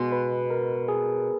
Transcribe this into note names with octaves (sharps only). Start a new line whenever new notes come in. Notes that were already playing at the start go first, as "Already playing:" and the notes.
Already playing: B2 G#3 B3
B4
A#4
G#4